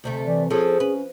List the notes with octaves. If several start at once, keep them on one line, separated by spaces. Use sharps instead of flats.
D2 C3 A3
E3 D5
F3 C#4 G#4 A4
C#4 B4